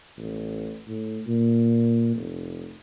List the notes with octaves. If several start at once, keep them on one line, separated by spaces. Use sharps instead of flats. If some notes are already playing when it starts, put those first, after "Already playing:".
A1
A2
A#2
F1